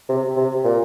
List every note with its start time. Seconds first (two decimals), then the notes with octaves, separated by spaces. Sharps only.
0.09 C3
0.37 C3
0.64 A#2